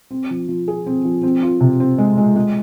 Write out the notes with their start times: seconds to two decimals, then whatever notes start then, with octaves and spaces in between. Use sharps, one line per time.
0.11 C4
0.30 F3
0.48 F3
0.68 G#4
0.86 C4
1.05 F3
1.23 C4
1.42 F4
1.60 C3
1.80 C4
1.98 G#3
2.18 G#3
2.36 G#3